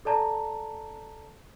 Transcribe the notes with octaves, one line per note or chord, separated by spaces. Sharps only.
A4 D5 A5 A#5